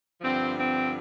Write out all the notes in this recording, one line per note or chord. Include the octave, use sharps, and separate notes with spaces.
G2 D3 F3 C4
C4